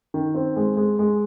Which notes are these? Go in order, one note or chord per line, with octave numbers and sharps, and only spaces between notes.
D#3
C4
G#3
G#3
G#3